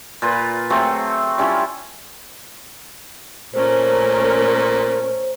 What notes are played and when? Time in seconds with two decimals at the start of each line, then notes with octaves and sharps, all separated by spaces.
0.22 A#2 F4 B4
0.70 F#3 A3 C4 G#4
1.38 G3 C#4 E4 F4
3.54 A#2 A3 C#4 A#4 C5